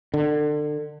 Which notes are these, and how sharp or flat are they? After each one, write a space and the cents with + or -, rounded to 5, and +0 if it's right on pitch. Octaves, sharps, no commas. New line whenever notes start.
D3 +30